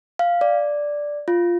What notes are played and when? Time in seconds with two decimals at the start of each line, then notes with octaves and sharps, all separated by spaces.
0.19 F5
0.41 D5
1.28 F4